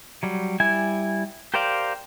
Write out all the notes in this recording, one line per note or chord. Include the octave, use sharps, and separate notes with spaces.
F#3 G3
G3 E4 G#5
G4 A#4 C5 D5 F5